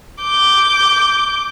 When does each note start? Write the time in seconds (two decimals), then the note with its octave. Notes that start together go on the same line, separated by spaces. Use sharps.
0.23 D6 G6